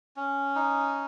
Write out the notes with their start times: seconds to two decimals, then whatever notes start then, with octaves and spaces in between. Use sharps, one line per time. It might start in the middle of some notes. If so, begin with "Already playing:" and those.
0.16 C#4
0.55 D#4